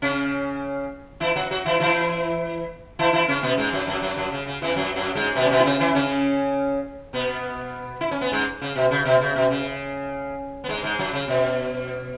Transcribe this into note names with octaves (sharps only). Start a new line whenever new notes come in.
C#3 C#4
E3 E4
F#3 F#4
F#3 F#4
E3 E4
E3 E4
E3 E4
E3 E4
C#3 C#4
B2 B3
G#2 G#3
F#2 F#3
F#2 F#3
F#2 F#3
F#2 F#3
C#3
C#3
E2 E3
F#2 F#3
F#2 F#3
G#2 G#3
B2 B3
C#4
B2 B3
E4
C#3 C#4
E3 E4
C#3 C#4
B2 B3
E4
C#4
B3
G#2 G#3
C#3
B2
C#3
B2
C#3
B2
C#3
B3
G#2 G#3
G#2 G#3
F#2 F#3
C#3
B2